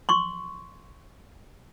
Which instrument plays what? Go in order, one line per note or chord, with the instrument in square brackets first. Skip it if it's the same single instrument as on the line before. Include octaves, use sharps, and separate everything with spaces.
[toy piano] C6 C#6